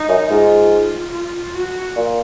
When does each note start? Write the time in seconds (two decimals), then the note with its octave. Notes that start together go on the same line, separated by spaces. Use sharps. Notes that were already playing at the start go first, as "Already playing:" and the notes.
Already playing: D#4
0.09 F#2
0.30 G#2 F4
1.13 F4
1.55 F#4
1.96 A#2